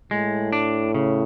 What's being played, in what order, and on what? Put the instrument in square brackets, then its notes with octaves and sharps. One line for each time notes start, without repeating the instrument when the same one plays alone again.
[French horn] A2 [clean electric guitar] G#3
[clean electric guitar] D4
C#3